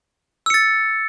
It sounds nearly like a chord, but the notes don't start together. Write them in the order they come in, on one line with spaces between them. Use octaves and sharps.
E6 C#7 A6